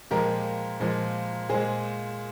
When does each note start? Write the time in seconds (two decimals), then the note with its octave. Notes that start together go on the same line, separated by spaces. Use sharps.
0.11 A#2 F3 G#3 G4 A#4
0.80 A#2 F3 G#3
1.49 A#2 G#3 G#4 C5